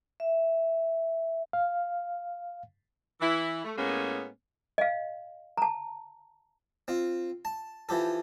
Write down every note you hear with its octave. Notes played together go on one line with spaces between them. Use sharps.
E5
F5
E3 E4
A3
A2 G#3 A#3 B3 C#4
D#5 F5
A5 A#5
C4 F4
A5
E3 F3 G4 A4